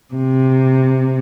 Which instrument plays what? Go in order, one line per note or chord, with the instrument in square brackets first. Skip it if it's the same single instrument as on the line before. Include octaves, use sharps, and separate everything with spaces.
[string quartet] C3